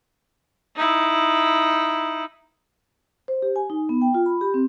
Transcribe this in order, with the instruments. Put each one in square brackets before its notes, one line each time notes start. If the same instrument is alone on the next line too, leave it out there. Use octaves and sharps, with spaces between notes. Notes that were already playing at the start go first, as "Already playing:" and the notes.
[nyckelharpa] D#4 E4
[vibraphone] C5
G4
G#5
D#4
B3
G5
F4
B5
G4
C4